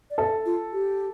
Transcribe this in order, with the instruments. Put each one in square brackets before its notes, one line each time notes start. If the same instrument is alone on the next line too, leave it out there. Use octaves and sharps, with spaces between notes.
[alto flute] D5
[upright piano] A4 [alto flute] E5
[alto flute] F4
G4